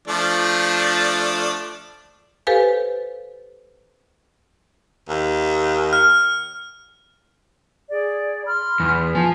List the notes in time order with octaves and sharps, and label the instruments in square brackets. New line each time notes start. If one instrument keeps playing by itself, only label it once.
[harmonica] F3 A3 D4
[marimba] G4 A4 B4 C5 F5 G#5
[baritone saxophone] D#2
[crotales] F6
[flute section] G#4 D5
B5 C6 F6
[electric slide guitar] E2
[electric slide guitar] F3 [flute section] G#5